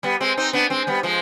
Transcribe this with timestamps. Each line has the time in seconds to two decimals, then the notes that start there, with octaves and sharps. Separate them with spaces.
0.03 G3 B3
0.20 G#3 C4
0.37 C4 D#4
0.53 B3 D4
0.70 G#3 C4
0.87 G3 B3
1.03 F3 G#3